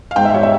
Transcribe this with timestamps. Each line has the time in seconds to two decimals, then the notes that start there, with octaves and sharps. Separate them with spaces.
0.11 F5
0.16 G#2 G5
0.25 E5
0.34 G3 C#5
0.43 E5